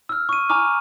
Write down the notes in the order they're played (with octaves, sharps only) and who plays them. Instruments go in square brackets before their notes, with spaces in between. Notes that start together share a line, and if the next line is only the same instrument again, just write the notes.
[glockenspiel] E6 F6
C#6 D#7
G#5 A#5 C#6 D6 F6